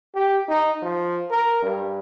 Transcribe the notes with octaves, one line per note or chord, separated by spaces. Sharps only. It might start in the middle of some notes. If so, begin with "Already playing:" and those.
G4
D#4
F3
A#4
G2